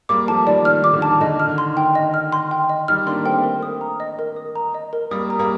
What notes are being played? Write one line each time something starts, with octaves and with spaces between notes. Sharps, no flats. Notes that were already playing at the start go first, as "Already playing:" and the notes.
G3 A#3 D6
F3 A3 A5
D#3 G3 D5
D#3 F6
D#3 D6
D3
A5
D#3
D3 D#5
F6
D#3
C6
D#3 G5
D#5
F6
C6
G5
D#5
D#3 G3 F6
A#3 D4 C6
A3 C4 G5
A#4
D#6
A#5
D#5
A#4
D#6
A#5
D#5
A#4
G3 A#3 D#6
A#5
G3 A#3